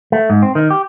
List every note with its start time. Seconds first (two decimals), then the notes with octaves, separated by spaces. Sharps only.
0.12 A3
0.30 G#2
0.42 C4
0.55 D#3
0.70 G4